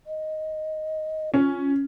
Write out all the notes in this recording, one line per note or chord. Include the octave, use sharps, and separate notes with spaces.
D#5
C#4 F4